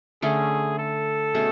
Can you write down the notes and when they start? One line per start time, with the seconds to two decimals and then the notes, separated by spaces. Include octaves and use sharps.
0.22 D3 A3 C#4 G#4
0.78 A4
1.34 B2 A3 C#4 G#4